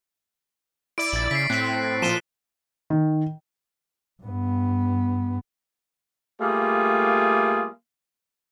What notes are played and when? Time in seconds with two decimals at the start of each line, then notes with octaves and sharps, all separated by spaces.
0.98 E4 D5 D7
1.13 A#1 A6 F#7
1.31 C#3 B6 C7
1.50 A2 C4 F#6 B6
2.02 A#2 F3 D#7 E7 G7
2.90 D#3
4.22 G2 B3
6.40 G3 A3 A#3 F4 G#4